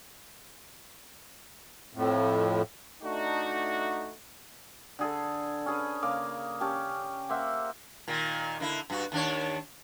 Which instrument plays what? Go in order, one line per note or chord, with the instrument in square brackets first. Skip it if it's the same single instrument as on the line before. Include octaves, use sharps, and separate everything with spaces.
[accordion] F2 A2
[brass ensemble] A3 D4 D#4 F#4
[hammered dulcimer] D3 G#4 A4
C#4 G#4 B4
C#3 A#3 F5 D6
C#4 G4 A5
A#3 C5 E5 F#5
[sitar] A#2 D#3
D3 A#3 E4
G2 F#4
D#2 D4 C#5